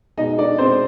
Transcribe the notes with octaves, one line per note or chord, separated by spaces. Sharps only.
B2 G#3 D#4 D#5
D4 D5
B2 G#3 C4 C5